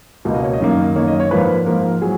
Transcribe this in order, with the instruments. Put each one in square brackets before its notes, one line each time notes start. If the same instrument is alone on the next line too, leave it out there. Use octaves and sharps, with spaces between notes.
[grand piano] C#2 B2 A#3
D#5
C#5
D#5
F#2 D#3 A#3
F#2 D#3 A#3 C#5
D#5
C#5
G#2 F3 A#3 B4
G#2 F3 A#3 A#4
F#3 G#4